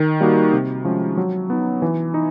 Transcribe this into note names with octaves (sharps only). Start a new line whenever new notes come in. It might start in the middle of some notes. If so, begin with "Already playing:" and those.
Already playing: D#3
G3 A#3 D#4 F#4
C3
F3 G#3 C#4
F#3
B3 D#4
E3
D#4